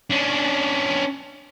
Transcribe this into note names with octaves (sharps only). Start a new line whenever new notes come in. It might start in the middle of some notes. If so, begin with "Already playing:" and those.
C#4 D4